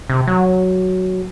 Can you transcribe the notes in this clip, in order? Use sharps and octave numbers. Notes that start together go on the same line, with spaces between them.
C3
F#3